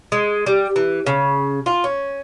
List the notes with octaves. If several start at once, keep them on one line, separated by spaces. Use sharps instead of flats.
G#3
G3
E3
C#3
F4
C#4